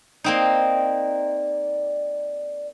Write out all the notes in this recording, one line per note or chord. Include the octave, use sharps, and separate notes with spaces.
A#3 C4 D#4 D5